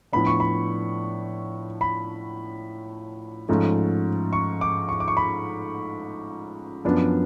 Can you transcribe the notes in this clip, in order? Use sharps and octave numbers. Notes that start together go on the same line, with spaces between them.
A2 F3 B3 D4 B5
C#6
B5
B5
G#2 F3 A3 C#4
C#6
D6
C#6
D6
C#6
B5
F#2 F3 B3 D4